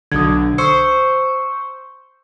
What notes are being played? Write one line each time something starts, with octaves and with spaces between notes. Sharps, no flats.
B1 D3 D#6 G#6
C5 C#6 E6 C#7